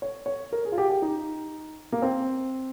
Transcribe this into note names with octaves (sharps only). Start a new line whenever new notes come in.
C#5
C#5
A#4
G#4
F4
G4
G4
D#4
A#3
C4